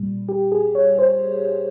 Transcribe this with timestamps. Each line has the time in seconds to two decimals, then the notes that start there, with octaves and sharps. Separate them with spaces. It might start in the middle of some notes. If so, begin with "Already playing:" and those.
Already playing: A#2 G3
0.29 G4
0.52 G#4
0.75 C#5
0.99 C5